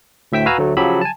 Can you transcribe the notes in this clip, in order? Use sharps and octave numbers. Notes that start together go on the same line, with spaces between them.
D2 A2 E5 G5 E6 B6
F#4 B4 F5 G#5 A#5 E6
D2 F#3 A3
C#3 F3 F#3 G4 B5 E6
G#5 A5